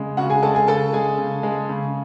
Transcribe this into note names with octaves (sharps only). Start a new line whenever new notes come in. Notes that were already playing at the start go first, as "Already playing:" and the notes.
Already playing: C#3 G#3
C#3 F#4 F#5
G#4 G#5
G#3 A4 A5
G#4 G#5
C#3 A4 A5
G#3 G#4 G#5
C#3
G#3
C#3